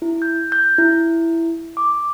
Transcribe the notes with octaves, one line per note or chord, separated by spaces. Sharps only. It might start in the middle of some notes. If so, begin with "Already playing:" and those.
E4
G6
G6
E4
D6